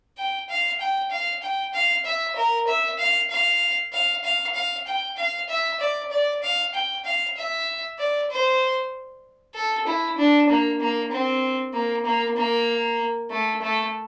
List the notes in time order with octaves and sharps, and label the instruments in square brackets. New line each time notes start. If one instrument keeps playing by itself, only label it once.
[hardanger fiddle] G5
F5
G5
F5
G5
F5
E5
A#4
E5
F5
F5
F5
F5
F5
G5
F5
E5
D5
D5
F5
G5
F5
E5
D5
C5
A4
E4
D4
A#3
A#3
C4
A#3
A#3
A#3
A3
A3